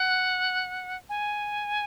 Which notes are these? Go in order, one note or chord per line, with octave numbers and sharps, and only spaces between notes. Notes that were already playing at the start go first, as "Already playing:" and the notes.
Already playing: F#5
G#5